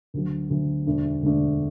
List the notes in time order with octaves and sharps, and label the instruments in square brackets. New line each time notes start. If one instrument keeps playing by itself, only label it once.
[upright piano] D2 D3 F#3
D2 D3 F#3
E1 D2 D3 A3 D4
E1 D2 D3 A3 D4